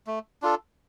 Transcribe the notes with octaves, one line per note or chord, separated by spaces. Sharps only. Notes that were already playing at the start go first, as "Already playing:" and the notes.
A3
D4 F4 A4